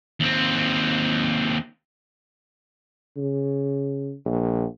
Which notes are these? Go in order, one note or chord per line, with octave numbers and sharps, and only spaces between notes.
D#2 C4
C#3
A#1